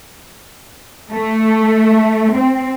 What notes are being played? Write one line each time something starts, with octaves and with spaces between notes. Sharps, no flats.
A3
C4